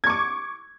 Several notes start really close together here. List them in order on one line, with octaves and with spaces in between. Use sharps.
G#6 C#6 D6